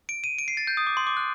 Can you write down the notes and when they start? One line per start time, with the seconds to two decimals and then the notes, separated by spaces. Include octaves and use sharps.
0.09 D7
0.24 D#7
0.38 D7
0.48 C7
0.57 A6
0.67 G6
0.77 D#6
0.87 D6
0.97 C6
1.07 D6
1.17 F#6